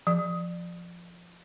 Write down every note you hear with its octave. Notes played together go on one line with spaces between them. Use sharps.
F3